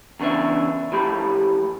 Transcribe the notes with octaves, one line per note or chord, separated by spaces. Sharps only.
E2 C#3 D4 B4 E5
A2 F3 G4 B5